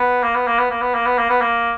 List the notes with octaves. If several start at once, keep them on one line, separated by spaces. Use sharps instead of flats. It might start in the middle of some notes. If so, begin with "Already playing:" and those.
Already playing: B3
A#3
B3
A#3
B3
A#3
B3
A#3
B3
A#3
B3
A#3